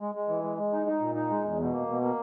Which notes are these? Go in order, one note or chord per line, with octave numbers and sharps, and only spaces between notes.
G#3
G#3
E3
G#3
G#3
D#4
D#4
A#2
D#4
G#3
E2
B2
A#3
B2
A#3